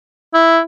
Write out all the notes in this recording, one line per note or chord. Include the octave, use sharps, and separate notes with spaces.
E4